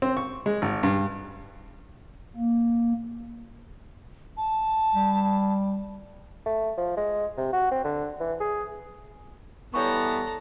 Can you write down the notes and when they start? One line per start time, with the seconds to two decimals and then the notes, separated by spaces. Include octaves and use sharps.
0.02 C4
0.17 C#6
0.46 G#3
0.62 G#1
0.83 G2
2.37 A#3
4.37 A5
4.94 G3
6.46 A3
6.78 F3
6.97 G#3
7.38 C3
7.53 F#4
7.71 C4
7.84 D3
8.20 E3
8.40 G#4
9.74 E3 G3 B3 A4 C#5 A#5 C#6